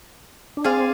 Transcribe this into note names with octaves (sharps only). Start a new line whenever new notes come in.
D4
C4 G#4 D5 F5